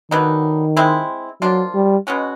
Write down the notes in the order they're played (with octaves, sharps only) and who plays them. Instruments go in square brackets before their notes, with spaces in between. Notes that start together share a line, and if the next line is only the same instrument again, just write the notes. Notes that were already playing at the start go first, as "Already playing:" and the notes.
[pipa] D3 F#3 B3 D#4 [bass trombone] D#3
[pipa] G#3 C4 E4
[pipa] F3 A#3 D4 F4 [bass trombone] F#3
[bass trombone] G3
[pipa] B2 G#3 C#4 F#4